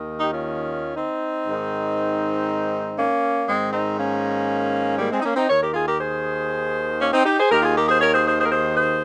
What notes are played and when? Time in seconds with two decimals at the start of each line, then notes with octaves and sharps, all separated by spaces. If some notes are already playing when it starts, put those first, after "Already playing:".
Already playing: D#2 D#3
0.20 D#4 G4
0.32 C#4 F4
0.96 C4 D#4
1.47 G#2 D#3
2.97 A#3 C#4
3.48 G#2 D#3 G#3 C4
3.73 C4 D#4
3.98 A#3 C#4
4.99 G3 A#3
5.11 G#3 C4
5.20 D#4
5.23 A#3 C#4
5.36 C4 D#4
5.49 D#2 D#3 A#4 C#5
5.62 G4 A#4
5.74 F4 G#4
5.86 G4 A#4
5.99 G#4 C5
7.00 A#3 C#4
7.13 C4 D#4
7.25 D#4 G4
7.38 G#4 C5
7.50 D#2 D#3 G4 A#4
7.63 F4 G#4
7.75 G4 A#4
7.88 G#4 C5
8.01 A#4 C#5
8.13 G#4 C5
8.26 G#4 C5
8.39 G#4 C5
8.45 A#4
8.51 G#4 C5
8.76 G#4 C5